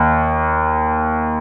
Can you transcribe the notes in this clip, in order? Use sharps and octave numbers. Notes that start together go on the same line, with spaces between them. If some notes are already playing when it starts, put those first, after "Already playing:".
Already playing: D#2